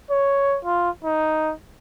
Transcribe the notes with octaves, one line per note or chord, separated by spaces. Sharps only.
C#5
F4
D#4